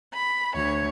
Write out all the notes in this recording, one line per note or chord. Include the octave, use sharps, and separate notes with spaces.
B5
D2 C#5